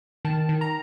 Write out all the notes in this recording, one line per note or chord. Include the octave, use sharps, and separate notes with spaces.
D#3 A5
D#3
A#5